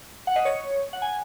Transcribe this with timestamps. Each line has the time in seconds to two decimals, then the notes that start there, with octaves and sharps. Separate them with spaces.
0.27 F#5
0.36 D#5
0.45 C#5
0.93 F#5
1.02 G#5